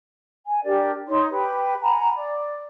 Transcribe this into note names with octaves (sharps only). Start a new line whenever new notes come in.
G#5
D4 G4 A#4 D5
D#4 C#5 C6
G4 B4 G5
F#5 G#5 A#5 B5
D5